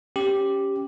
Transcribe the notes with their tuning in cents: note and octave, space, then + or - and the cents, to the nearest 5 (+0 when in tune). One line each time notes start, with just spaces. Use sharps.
C#4 +0 G4 +0